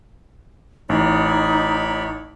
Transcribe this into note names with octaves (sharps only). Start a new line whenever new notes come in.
A1 D#4 C#5 D5 B5